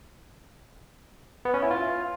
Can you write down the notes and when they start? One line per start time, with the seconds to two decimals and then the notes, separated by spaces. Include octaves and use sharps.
1.45 B3
1.54 C#4
1.62 E4
1.71 F4